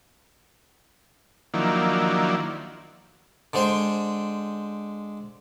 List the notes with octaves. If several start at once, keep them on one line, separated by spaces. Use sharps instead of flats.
D#3 F3 F#3 A#3 D4 E4
D3 G#3 C5 G5